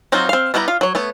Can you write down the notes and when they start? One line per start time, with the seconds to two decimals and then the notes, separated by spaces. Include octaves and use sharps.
0.12 F#3 C4 D#4 F4 F#4
0.29 C4 F5
0.54 G3 B3 E4 G5 A#5
0.68 F4 F5
0.81 F#3 C#5
0.95 A3 B3 C#5